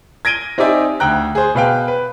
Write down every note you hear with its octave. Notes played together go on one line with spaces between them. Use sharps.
G#6 A#6 D7 D#7 G7
C4 D#4 G4 D5 E5 G#5
D2 G5 A#5 F#6
G#4 C5
B2 B4 F5 G5
B4